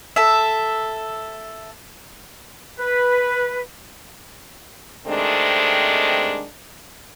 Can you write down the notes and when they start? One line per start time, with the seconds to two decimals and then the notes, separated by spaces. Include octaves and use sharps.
0.16 A4 E5
2.79 B4
5.07 C3 D#3 G#3 A3 C4 D4